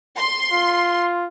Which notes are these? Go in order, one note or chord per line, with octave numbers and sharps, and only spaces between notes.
C6
F4